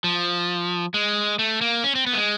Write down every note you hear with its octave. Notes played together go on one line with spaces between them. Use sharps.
F3
G#3
A3
A#3
C#4
C4
B3
A3
G#3